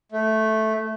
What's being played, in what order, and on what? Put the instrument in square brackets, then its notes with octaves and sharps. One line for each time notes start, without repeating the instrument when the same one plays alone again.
[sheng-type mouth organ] A3